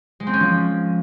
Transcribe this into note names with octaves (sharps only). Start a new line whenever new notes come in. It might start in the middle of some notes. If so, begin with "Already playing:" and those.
G#3
C4
C#4
F3